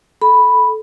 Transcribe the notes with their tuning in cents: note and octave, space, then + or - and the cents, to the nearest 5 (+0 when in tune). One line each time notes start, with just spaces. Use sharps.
A4 -15 B5 +0